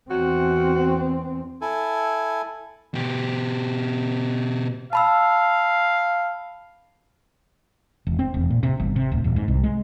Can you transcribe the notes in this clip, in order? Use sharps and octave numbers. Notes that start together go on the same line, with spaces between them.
E2 C4 F#4
E4 A4 G#5
B2 G4
F5 A5 B5 E6
E1
C4
E1
A#2
C3
G1
C3
D1
D#1
G#2
C2
G#3